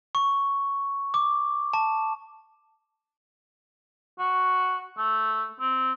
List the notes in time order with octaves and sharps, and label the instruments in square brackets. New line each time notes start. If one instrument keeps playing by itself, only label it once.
[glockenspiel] C#6
D6
A5
[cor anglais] F#4
A3
C4